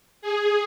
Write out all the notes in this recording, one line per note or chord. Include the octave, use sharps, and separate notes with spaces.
G#4